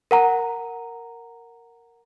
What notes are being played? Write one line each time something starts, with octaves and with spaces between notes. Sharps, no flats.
A#4 F#5 A#5